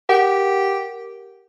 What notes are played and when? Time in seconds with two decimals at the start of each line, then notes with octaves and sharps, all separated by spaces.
0.09 G4 A#4 F#5